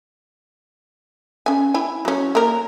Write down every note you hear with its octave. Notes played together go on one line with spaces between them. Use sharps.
C#4 G#5
E4 G#5
F#3 C#4
A#3 A#4